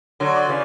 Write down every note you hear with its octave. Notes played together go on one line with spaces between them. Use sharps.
D3 F#3
D5
C#3 E3